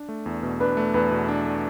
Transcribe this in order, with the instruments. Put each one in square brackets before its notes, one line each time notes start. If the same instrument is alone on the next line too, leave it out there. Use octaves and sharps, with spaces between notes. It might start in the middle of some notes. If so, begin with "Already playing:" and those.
Already playing: [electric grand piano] D4
A3
E2
B2
[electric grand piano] D4 [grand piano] B4
[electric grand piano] A3
[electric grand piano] E2 [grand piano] B4
[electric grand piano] B2
D4
A3